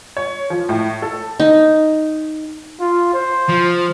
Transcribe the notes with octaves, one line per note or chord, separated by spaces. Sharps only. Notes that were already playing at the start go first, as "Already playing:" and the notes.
C#5
F3
A2
A4
D#4
F4
C5
F3